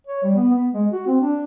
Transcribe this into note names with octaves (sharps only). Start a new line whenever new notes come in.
C#5
G3
B3
B3
G#3
F#4
C4
D4